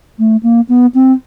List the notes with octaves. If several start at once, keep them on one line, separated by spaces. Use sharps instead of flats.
A3
A#3
B3
C4